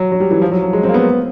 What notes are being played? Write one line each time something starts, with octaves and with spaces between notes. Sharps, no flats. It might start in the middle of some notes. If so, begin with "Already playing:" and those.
Already playing: F#3
F#3
G3
E3
F3
F#3
F#3
G#3
C4
A#3
B3